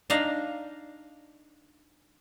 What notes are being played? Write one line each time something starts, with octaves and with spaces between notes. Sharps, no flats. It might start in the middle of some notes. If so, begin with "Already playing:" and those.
D4 D#4 F5 A#5